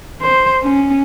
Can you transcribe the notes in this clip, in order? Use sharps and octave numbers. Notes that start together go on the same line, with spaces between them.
C5
C#4